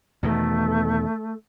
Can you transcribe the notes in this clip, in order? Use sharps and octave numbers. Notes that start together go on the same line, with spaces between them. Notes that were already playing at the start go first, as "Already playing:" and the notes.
E2 B2 D#3 A3